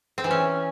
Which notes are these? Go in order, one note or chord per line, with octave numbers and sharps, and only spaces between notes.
C4
E3
C#4